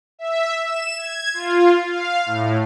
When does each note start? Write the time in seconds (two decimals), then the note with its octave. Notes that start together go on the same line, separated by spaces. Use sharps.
0.19 E5
0.64 E7
0.97 G#6
1.34 F4
1.86 F5
2.26 A2